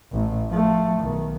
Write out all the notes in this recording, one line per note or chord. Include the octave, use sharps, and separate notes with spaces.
A1 A2
F3 A3
B1 D#3